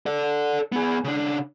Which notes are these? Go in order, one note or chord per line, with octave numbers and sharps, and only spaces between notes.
A4 D5
B3 G#4
C#3 D4